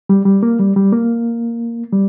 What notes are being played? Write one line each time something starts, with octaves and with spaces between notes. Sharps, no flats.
G3
G3
A#3
G3
G3
A#3
G3